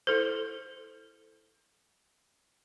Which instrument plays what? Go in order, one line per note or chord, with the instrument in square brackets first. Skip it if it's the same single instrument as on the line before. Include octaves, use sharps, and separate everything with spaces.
[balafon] E4 A4 C5